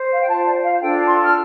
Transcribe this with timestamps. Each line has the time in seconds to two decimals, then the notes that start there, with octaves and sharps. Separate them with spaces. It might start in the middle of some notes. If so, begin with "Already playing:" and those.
Already playing: C5
0.12 F5
0.20 G5
0.28 F4 C5 A5
0.46 D5
0.63 F5
0.81 D4 F4 A4 G5
1.07 C6
1.25 F6